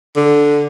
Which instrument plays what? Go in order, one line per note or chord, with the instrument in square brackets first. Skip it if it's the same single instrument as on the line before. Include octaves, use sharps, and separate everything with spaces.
[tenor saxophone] D3